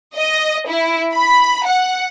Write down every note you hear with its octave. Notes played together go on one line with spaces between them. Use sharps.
D#5
E4
B5
F#5